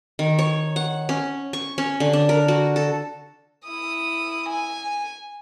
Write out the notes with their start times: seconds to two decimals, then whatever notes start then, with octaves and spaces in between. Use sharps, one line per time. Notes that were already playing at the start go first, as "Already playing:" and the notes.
0.19 D#3
0.39 C#5
0.76 F#5
1.09 C#4
1.53 C#6
1.78 C#4
2.00 D3
2.13 D4
2.29 A#4
2.48 F#4
2.76 A4
3.68 E4 D#6
4.49 G#5